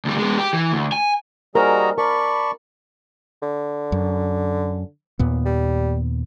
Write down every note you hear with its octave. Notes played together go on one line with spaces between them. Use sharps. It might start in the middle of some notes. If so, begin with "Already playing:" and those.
D2 G3
G#3 B3
G4
E3
D2
G#5
G3 F#4 G#4 A#4 C5 D#5 A#5
A#4 D5 A5 B5 C#6
D3
F#2
D#2 A#2 B3
G3